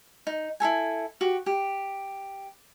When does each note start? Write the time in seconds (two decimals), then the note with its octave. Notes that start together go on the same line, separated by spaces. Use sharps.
0.27 D#4
0.60 E4 G4 A4 G#5
1.21 F#4 G4
1.46 G4